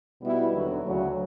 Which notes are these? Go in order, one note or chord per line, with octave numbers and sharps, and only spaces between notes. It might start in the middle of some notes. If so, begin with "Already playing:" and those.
B2 G3 B3 E4
D#2 D3 F#3
D2 C#3 F#3